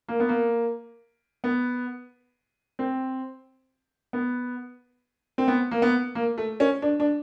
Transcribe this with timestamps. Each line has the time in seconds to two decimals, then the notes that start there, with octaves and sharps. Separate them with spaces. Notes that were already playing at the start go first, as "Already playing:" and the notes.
0.08 A#3
0.20 B3
0.29 A#3
1.44 B3
2.79 C4
4.13 B3
5.38 C4
5.48 B3
5.71 A#3
5.82 B3
6.15 A#3
6.38 A3
6.60 C#4
6.82 D4
7.00 D4